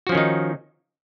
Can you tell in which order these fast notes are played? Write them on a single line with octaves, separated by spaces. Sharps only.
F#4 F3 C#4 D#3 D#4